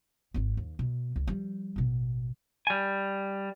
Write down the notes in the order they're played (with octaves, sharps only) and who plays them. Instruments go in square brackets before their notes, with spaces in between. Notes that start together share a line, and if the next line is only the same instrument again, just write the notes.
[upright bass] G#1 C4
D#2
B2
C#2
F3 G3
A1 B2
[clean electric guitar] G3 G#5